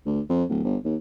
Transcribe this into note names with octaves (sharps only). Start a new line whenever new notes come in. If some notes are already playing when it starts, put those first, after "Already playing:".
D2
F2
D1
G1
D#2